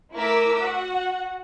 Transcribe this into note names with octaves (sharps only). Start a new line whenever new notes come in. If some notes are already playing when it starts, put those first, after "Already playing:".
A3 E4 A#4 D6 E6 B6
F#4 F#5